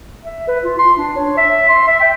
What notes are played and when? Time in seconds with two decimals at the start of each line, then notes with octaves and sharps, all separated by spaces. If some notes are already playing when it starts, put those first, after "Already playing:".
0.24 E5
0.48 B4
0.64 F4
0.79 C6
0.98 D4
1.16 C#5
1.37 E5
1.69 C6
1.87 E5
2.00 G5